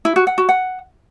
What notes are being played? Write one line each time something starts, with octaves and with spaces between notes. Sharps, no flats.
E4
F#4
F#5
F#4
F#5